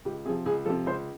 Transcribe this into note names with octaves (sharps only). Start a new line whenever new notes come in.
C#2 G4
C3 F3 G#4
C#2 G#4
C3 F3 A4
C#2 C5